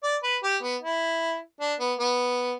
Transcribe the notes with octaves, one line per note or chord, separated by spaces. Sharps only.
D5
B4
G4
B3
E4
D4
B3
B3